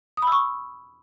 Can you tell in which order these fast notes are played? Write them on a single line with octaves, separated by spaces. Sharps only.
D#6 B5 E6 C#6